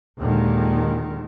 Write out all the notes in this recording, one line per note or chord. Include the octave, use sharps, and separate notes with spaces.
D#2 A#2 D3 D#3 G#3